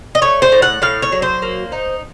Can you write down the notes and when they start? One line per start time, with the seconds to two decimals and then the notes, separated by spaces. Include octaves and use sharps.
0.15 D#5
0.22 A3 C#5
0.42 C5
0.52 A2
0.62 F#5
0.82 A2 F5
1.02 C#5
1.12 F#3
1.22 C5
1.42 A#3
1.72 D#4